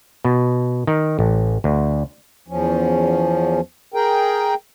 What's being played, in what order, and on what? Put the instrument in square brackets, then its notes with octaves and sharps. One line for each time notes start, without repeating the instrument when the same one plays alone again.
[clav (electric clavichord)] B2
D#3
A1
D2
[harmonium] E2 F3 C#4
G#4 A#4 G5